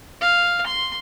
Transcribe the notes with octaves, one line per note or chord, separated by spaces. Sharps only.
F5
C6